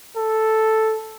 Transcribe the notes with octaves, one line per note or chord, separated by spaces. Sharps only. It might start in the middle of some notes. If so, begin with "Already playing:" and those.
A4